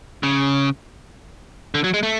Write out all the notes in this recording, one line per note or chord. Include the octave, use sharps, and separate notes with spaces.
C#3
D3
F#3
G#3
A3